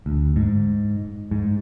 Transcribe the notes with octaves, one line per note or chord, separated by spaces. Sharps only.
D2
G#2
G#2